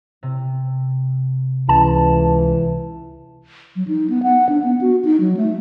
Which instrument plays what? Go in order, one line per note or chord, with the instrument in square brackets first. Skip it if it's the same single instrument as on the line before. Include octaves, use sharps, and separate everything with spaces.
[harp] C3
[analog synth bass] C#2 [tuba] E3 [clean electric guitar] A5
[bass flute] F#3
D#4
B3
F#5
D4
B3
F#4
D#4
F#3
A3